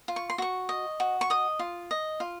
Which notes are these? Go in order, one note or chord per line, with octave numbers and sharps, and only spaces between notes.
F4
C#6
C6
F#4 C#6
D#5
F#4
C#6
D#5 D#6
F4
D#5
F4